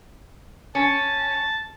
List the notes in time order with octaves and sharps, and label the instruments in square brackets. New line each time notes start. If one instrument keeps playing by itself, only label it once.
[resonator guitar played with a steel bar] C#4 [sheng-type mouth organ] A5